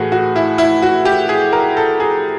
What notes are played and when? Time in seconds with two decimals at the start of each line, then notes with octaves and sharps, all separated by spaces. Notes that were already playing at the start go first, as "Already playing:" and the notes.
Already playing: A2 E3 A3 F#4 G#4
0.12 F#4
0.36 E4
0.58 E4
0.82 F#4
1.05 G4
1.29 G#4
1.53 A#4
1.77 A4
2.00 G#4